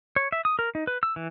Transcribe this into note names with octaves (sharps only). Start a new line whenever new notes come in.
C#5
E5
D#6
A#4
D#4
B4
E6
E3